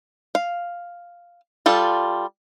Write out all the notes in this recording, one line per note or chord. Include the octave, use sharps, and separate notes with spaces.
F5
G3 F4 A4